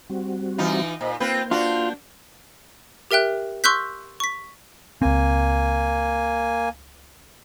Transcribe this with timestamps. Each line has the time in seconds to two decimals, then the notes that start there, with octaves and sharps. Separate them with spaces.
0.10 G3 C4 F#4
0.58 E3 D#4 F4
1.01 A#2 C5 D#5 B5
1.20 A#3 C4 F4 B4 G6
1.51 D4 F4 F#4
3.11 G4 A#4 E5 G5 F#6
3.64 C6 C#6 E6 F#6 G6 B6
4.20 C#6 B6
5.02 C#2 A#3 C4 G#5